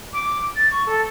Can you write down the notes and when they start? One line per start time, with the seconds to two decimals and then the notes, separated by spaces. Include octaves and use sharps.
0.13 D6
0.56 A6
0.72 C#6
0.86 A4